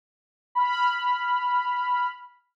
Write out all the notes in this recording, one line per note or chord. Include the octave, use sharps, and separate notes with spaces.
B5 F6